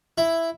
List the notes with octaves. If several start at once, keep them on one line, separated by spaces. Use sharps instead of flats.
E4